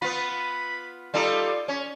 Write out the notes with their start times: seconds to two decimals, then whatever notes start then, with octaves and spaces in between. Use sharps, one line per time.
0.02 B3 F4 B5
1.14 G3 D#4 F4 A4
1.68 C#4 C#5